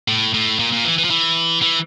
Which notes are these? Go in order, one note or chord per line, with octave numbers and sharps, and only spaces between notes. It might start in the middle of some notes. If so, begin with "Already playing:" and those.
A2
A2
A#2
A#2
E3
E3
F3
E3
E3